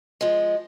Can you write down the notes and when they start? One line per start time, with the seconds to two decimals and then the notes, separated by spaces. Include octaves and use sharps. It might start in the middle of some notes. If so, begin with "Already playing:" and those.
0.21 F3 G#3